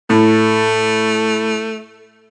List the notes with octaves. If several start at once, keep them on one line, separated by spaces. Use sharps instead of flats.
A2 A3